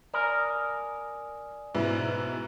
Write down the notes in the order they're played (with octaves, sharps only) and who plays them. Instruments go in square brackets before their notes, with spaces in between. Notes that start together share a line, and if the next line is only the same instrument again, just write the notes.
[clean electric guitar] A#4 [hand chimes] D5 G#5 D#6
[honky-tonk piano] G#2 B2 E4